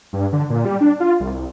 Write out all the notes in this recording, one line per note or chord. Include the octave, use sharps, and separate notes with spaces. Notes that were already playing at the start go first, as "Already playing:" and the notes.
G2
D3
A#2
G3
D4
F4
C2